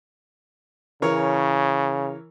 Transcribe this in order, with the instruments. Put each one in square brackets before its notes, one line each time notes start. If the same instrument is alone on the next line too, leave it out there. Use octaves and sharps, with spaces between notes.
[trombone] C#3 [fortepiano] E3 A#4 C#5